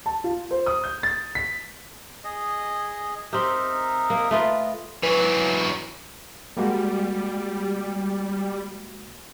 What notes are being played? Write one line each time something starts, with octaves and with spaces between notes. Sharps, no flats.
A5
F4
C5
D#6
G6
A6
B6
G#4 D#5
C4 D#4 G4 A#4 E5
A#3
A3 F4 B4 D#5
E3 F#3 B4
G3 G#3 A#3 F#4